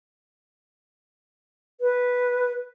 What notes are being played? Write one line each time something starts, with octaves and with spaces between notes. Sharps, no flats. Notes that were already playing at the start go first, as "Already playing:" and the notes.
B4